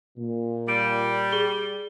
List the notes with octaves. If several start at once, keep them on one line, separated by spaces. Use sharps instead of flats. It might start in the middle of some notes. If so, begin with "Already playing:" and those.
A#2
G3 D7
G#4 G7